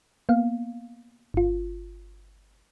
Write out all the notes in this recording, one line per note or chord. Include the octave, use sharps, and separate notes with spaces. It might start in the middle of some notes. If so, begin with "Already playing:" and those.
A#3 B3 F5
G1 F4